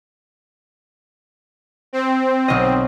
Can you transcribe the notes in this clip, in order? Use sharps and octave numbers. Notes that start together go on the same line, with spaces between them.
C4
B1 D#5